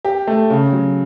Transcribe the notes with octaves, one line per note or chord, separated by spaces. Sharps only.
G4
A3
C#3
F#3